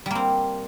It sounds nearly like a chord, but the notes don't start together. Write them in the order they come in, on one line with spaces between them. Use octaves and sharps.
G3 A#3 C4